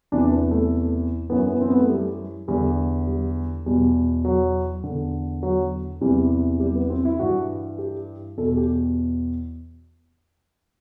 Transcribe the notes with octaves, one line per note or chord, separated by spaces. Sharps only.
E2 C3 E3 D4
B3
A3
F#2 E3 B3
B3
C4
B3
A3
G3
E2 D3 G3
G3
E2 B2 G3
F#3
E2 D3
F#3
E2 C3 E3 G3
G3
B3
C4
E4
G2 E3 F#4
G4
E2 B2 A4
G4